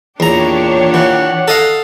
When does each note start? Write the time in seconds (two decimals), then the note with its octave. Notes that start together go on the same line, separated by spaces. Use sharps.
0.20 E2 A#2 D4 G4 C#5 A#5
0.94 E3 F#5
1.48 A4 D#5 F5